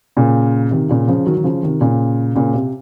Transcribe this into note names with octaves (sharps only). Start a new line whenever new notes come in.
A#2 C#3
C3 D#3
A#2 C#3
C#3 F3
D#3 F#3
D#3
C#3 F3
C3 D#3
A#2 C#3
A#2 C#3
C3